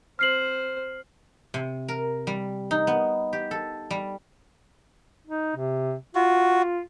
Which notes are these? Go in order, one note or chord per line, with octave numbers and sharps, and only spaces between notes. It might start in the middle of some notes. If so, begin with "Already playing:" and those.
C4 C5 F6 C7 F#7
C3
A#4
G3
D#4
B3
G4
A4
G3
D#4
C3
F4 F#4